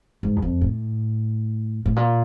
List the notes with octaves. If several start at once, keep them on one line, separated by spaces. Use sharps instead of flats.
G#2
E2
F2
A2
A2
A#2